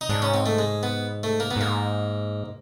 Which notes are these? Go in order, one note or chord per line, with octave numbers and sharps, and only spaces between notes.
D#4
G#2 D4
C#4
C4
A3
G#3
B3
A3
A#3
B3
G#2 A#3